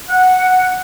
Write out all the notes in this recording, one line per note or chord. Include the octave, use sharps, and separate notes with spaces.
F#5